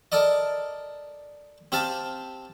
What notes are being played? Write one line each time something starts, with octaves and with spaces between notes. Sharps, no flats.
A4 A#4 D5 D#5
C4 G4 F5 A5